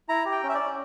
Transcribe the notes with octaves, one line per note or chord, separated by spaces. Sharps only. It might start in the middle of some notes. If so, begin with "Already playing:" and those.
E4 A#5
G4
G5
C#4
E5
D5
C#4